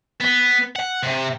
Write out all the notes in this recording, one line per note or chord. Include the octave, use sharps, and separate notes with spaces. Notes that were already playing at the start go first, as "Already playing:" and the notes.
B3
F#5
C3